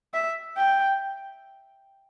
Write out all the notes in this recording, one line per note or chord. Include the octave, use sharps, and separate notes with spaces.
E5
G5